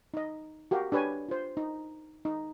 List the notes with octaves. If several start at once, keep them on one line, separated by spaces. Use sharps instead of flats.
D#4 D#5
F#4 G4 A#4 F5
D4 G4 B4 C#5 G#5
F4 C5
D#4
D#4